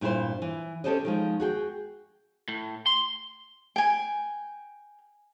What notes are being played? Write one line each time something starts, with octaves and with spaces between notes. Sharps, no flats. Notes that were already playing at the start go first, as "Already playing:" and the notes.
G2 A#2 E4 G#4 C5
E3
C#4 G4 A4 C5 D5 D#5
D#3 F3 G#3
F#4 G#4 G5
A2
C6
G5 G#5